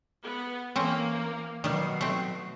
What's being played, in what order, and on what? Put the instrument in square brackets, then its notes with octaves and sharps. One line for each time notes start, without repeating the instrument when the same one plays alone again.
[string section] B3
[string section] E3 A#3 [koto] C4 C#4 C5
[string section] B2 F#3 [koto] D#3 G3
[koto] A3 C4